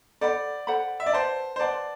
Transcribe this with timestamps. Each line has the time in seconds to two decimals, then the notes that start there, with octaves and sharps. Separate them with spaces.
0.21 A4 C5 D5 F#5 B5
0.67 A4 C5 F#5 B5
1.00 E5
1.06 D5
1.13 B4 C5 F#5 A5
1.56 C5
1.60 B4 D5 F#5 A5